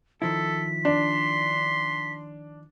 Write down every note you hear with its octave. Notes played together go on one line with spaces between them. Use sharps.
D#3 F3 E4 A4 B6
D4 C6